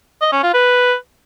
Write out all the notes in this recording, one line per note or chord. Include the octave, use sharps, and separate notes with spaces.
D#5
C#4
F4
B4